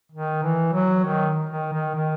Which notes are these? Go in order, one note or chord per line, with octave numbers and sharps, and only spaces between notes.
D#3
E3
F#3
D#3
D#3
D#3
D#3